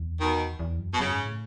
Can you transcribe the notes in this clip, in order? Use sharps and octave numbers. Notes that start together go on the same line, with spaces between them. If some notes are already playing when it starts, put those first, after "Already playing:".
Already playing: E2
B2 D#3
E2
F#2
B2
F#2 C#3
G#2
A2